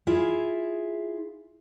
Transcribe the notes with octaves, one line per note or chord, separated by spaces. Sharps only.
E4 F4 G#4 E5